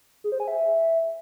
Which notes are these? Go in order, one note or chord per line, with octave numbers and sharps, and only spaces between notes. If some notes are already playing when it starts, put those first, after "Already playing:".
G#4
C5
G#5
E5